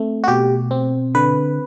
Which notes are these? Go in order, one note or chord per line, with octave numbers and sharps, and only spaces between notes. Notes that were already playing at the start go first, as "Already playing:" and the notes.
Already playing: A3 C4
F#4
B2 G4
C4
D3 B4